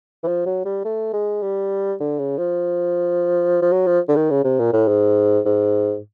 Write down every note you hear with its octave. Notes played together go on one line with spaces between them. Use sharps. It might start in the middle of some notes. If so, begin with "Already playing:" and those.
E3
F3
F#3
G3
A3
G#3
G3
D3
C#3
F3
F3
F#3
F3
D3
D#3
C#3
C3
A#2
A2
G#2
G#2